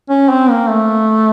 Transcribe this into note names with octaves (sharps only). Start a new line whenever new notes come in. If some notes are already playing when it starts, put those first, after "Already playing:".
C#4
C4
A#3
A3